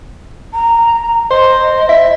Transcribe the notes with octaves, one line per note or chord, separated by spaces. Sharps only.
A#5
C5 D#5
E5